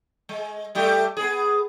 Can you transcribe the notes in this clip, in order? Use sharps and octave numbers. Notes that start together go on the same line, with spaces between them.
G#3
G3 A3 G4
B3 G#4